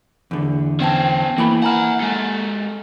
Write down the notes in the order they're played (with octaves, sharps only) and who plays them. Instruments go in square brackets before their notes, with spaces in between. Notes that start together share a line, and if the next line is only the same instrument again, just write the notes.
[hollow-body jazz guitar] E2 D3
[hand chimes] B3 G5 A5 [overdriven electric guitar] C#4 C5
[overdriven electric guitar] E3 [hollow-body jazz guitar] A#3 E4 B5
[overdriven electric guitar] E5 F#5 [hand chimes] G#5 A#5 F6
[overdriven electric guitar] G#3 A4